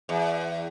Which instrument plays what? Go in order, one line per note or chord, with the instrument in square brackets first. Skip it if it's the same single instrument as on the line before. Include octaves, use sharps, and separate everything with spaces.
[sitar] E2